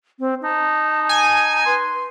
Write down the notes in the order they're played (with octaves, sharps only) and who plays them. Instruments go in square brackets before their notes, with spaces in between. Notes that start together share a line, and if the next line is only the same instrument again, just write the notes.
[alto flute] C4
[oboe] D#4 [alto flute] A5
[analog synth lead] G#5
[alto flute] B4 [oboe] C6